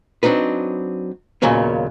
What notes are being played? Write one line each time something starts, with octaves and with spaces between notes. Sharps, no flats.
F#3 C4 D4 D#4 B4
D#2 A#2 C#3 F#3 B3 C#4